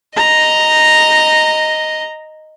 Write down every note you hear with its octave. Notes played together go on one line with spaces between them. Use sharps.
D#5 A#5